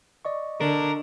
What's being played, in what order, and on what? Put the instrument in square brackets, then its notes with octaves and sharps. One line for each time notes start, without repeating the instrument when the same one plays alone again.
[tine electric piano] D5 D#5 C#6
[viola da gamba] D3 [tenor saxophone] D4 [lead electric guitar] A#4